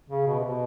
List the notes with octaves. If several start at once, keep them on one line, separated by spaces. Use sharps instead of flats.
C#3
B2
C3
B2